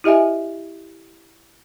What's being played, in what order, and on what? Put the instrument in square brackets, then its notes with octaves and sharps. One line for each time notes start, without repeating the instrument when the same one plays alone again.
[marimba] E4 G4 D#5 E5 G#5